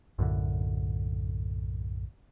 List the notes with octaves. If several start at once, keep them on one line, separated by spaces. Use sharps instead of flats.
B1 F#2 A2 D3